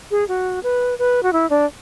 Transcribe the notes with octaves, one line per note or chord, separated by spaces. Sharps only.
G#4
F#4
B4
B4
F#4
E4
D4